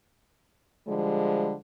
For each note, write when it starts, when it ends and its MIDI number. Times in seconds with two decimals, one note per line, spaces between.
0.87 1.54 50
0.87 1.54 53
0.87 1.54 55
0.87 1.54 56